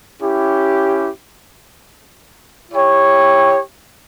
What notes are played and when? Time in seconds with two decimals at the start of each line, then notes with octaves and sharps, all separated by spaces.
0.21 C#4 E4 G4
2.71 E4 G4 C#5 G5